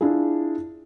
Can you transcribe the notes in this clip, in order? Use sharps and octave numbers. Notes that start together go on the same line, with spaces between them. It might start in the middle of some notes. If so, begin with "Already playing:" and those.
D4 E4 F4 G#4